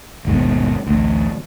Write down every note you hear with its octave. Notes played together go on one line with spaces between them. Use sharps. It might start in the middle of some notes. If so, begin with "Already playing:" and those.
G#1 D#2 G#2 B2
A1 D2